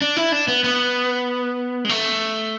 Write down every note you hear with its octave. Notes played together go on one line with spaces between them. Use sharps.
D4
E4
D4
B3
B3
G#3
A3